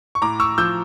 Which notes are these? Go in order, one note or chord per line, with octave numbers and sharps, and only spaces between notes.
C#6
A2 A#5 D6
C#6 E6
F3 E6 G6